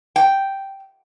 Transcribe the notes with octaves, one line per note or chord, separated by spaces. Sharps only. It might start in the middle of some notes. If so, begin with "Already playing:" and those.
G5